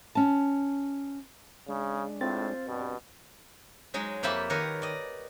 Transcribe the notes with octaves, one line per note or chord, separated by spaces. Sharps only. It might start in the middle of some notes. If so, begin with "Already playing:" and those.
C#4 A5
C#3 G#3 D4
A2 C4 F4 C5 A6
G2 B2 G4
F#3 G#3 D#4
F2 A#3 G4 E5 A5 B5
D#3 A#4 B4 C#5 D#5
D5 D#5